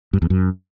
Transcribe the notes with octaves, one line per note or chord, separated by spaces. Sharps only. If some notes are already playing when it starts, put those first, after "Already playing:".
G2
E2
F#2